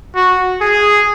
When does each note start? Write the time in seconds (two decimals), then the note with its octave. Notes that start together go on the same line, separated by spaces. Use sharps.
0.15 F#4
0.61 G#4